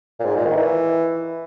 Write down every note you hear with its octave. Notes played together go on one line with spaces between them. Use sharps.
A#2
G#2
A#2
D#3
E3